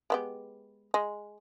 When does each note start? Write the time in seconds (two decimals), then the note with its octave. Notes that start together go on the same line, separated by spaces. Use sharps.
0.10 G#3 B3 G4
0.94 G#3